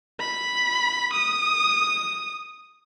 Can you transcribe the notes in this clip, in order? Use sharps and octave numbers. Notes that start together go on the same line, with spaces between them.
B5
D#6